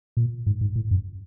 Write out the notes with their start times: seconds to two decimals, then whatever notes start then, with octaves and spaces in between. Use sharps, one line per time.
0.17 A#2
0.46 G#2
0.61 G#2
0.76 A2
0.91 F#2